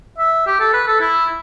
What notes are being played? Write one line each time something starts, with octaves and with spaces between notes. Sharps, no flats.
E5
G4
A4
B4
A4
E4